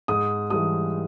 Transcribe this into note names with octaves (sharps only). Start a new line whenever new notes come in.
G#2 D#6
E3 G3 D#6